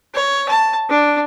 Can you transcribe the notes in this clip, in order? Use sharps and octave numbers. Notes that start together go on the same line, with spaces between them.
C#5
A5
D4